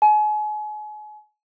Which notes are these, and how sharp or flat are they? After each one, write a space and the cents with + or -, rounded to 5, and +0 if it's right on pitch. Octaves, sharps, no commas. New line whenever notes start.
G#5 +35